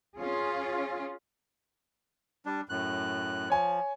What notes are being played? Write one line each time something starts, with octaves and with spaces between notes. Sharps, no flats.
C#4 F4 G#4
G3 D4
F#2 A2 F#6
F3 C#5 G#5